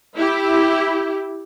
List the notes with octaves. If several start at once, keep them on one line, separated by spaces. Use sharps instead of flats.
E4 G4